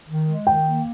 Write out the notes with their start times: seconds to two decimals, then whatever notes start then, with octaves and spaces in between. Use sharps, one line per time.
0.08 D#3
0.28 G#3
0.46 D#3 G5
0.65 A#3